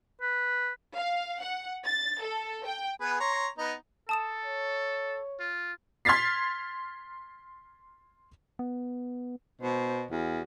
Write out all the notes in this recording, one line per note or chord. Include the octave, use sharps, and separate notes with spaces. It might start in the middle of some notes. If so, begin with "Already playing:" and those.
B4
F5
F#5
A6
A4
G5
B3 G#4 B4
C#5 A#5 C6
B3 D#4
A4 A5 D#6 E7
C#5
F4
C6 F6 G#6 A6 B6 C7
B3
B2 C5
E2 F#4